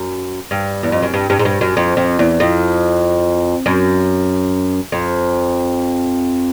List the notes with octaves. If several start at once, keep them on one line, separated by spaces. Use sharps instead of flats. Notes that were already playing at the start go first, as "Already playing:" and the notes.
Already playing: F#2
G2
E2
F2
F#2
G2
G2
G#2
G2
F#2
F2
F2
E2
F2
F#2
F2